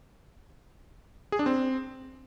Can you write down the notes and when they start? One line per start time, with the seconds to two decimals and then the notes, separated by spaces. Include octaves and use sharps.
1.32 G#4
1.39 D4
1.46 C4